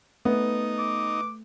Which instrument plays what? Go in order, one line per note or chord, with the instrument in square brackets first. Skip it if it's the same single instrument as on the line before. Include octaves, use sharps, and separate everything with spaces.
[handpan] A3 [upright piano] B3 [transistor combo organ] D#4
[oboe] D6